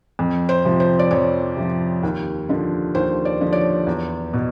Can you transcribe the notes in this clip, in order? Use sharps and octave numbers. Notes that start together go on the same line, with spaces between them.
F2
C5
C3 F3
C5
D5
F2 C#5
C3 F3
D#2
D3 F3
D#2 C5
D5
D3 F3
D5
C#5
E2
B2